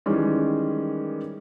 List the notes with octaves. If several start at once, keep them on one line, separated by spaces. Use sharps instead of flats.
D#3 E3 G3 G#3 C#4